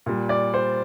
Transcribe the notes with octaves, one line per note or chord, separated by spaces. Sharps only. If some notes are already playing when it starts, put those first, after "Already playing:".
A#2 G3
D5
C5